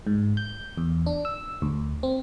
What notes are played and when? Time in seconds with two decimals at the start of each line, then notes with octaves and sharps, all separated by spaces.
0.07 G#2
0.37 G6
0.77 E2
1.06 D4
1.25 E6
1.62 D2
2.03 C4